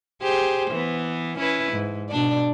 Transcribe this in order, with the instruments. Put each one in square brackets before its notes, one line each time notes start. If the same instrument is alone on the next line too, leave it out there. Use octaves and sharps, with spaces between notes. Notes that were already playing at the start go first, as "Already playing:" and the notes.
[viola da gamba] G4 G#4 C5
E3 B3
C#4 E4 B4
G#2
B2 D4 D5